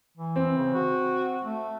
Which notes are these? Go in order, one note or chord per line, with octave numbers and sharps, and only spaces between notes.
E3
C4
C#3
F#4
A3